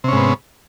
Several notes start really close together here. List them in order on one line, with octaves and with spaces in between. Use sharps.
C3 C#4 G#2 B3